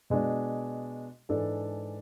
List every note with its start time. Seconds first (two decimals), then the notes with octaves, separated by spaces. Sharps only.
0.10 B2 G#3 D4
1.29 G#2 E3 G#3 D4 A4